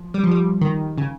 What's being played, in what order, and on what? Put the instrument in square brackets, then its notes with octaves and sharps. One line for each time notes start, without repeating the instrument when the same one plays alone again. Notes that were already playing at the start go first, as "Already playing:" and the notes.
Already playing: [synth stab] F3
G3
F3
G3
D#3
C#3